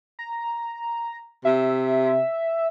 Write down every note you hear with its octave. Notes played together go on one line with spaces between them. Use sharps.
A#5
C3 E5